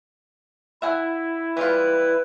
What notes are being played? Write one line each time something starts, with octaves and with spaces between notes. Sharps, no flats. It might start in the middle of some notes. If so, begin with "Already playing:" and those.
E4 E5 F#5 G#5
E3 G3 F4 B4